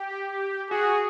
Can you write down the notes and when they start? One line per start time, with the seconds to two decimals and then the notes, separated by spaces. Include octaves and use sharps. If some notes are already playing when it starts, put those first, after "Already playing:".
Already playing: G4
0.71 F#4 G#4